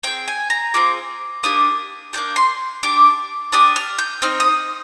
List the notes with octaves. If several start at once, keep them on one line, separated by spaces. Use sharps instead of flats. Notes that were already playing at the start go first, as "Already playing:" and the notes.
C4 F4 G#4 G5
G#5
A#5
C4 F4 G#4 D6
A#3 D4 G4 D#6
A#3 D4 G4 G6
C6
D4 G4 D6
D4 G4 D#6
F6
G6
C4 D#4 F6
D#6